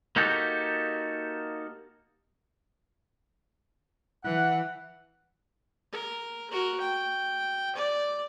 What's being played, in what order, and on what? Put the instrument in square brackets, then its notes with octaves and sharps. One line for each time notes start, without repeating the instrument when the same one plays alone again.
[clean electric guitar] A#3 D#4 F#4 G4 A4
[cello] E3 [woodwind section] F#5
[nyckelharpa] A#4
F#4 A#4
G5
D5